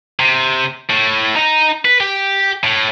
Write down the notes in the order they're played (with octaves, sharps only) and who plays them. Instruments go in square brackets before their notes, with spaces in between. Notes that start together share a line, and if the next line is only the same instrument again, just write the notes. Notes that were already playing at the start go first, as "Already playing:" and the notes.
[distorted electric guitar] C3
A2
D#4 A#5
B4
G4
A2